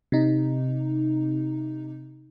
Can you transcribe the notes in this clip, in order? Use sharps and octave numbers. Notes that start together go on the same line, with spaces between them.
C3 D#4